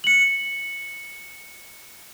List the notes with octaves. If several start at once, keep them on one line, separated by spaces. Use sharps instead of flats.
C#7 F#7